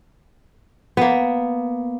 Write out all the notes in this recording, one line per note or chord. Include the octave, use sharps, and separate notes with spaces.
A#3 B3